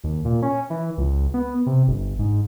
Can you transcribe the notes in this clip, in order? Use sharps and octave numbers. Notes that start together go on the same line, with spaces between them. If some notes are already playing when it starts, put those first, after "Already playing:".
D#2
A#2
C#4
E3
C#2
B3
C3
G1
G#2